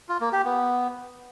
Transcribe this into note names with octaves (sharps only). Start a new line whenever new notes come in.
F4
A#3
G4
B3